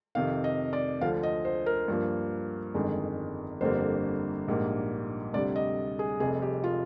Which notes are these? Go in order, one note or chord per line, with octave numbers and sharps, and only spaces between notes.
F2 C3 D#3 F5
D#5
D5
D2 D3 F3 F5
D#5
C5
A#4
G2 F3 A#3
G1 F2 D#3 G#3
G1 F2 D3 G3 A#3 C5
A#1 G#2 G3 A#3
D2 C3 G3 D5
D#5
G#4
F1 F2 C3 G#4
G4
F4